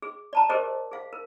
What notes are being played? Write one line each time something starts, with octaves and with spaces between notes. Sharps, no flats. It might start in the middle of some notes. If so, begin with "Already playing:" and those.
G#4
D5 A5 A#5
G4 G#4 A#4 C5 D5 D#5
G#4 F5
A#4